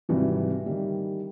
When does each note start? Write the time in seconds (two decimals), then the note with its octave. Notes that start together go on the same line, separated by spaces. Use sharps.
0.09 G#1 C3 E3 F#3 G3
0.66 D#3 G3